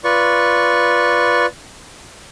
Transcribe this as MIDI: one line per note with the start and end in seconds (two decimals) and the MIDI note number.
0.04 1.46 65
0.04 1.46 71
0.04 1.46 74
0.04 1.46 85